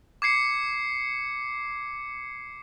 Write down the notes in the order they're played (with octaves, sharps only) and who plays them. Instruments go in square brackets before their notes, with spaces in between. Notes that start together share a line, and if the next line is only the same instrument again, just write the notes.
[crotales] D6 G#6 C7 C#7